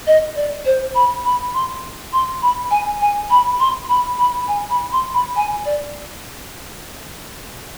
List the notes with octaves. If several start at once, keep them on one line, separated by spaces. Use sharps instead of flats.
D#5
D5
C5
B5
B5
C6
C6
B5
G#5
G#5
B5
C6
B5
B5
G#5
B5
C6
B5
G#5
D5